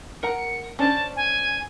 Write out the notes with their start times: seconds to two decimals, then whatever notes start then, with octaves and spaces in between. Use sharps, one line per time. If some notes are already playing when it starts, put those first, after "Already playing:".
0.23 A#4 F#5 A#5 C#7
0.79 C#4 D4 C5 A5
1.16 G#5